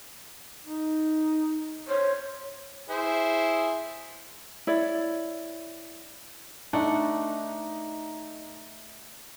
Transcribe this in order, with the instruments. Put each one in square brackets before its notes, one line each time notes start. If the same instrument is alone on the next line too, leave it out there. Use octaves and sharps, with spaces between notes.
[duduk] D#4
[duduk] C5 [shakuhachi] C#5
[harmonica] E4 G#4 C5
[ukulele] E4 C#5 D5
[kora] A3 D4 F#5 [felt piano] D#4